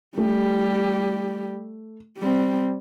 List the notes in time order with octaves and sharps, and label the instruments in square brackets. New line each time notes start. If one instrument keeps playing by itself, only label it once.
[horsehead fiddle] G3 G4 [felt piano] A3
[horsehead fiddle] G3 C4